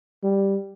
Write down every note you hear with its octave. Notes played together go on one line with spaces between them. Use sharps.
G3